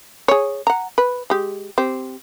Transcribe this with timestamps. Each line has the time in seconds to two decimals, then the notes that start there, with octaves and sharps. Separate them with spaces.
0.28 G#4 C#5
0.67 F#5 A#5
0.98 B4
1.30 G#3 G4
1.78 C4 G4